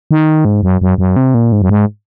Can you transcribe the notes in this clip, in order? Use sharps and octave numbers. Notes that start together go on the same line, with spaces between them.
D#3
G#2
F#2
F#2
F#2
C3
A#2
G#2
F#2
G#2